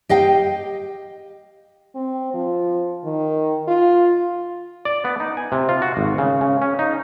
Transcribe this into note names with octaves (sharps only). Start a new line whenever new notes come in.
G4 D#5 F5 G5
C4
F3
D#3
F4
D5
B3
D#4
G#5
C3
F4
F#4
G#1
C#3
C#3
C#4
D#4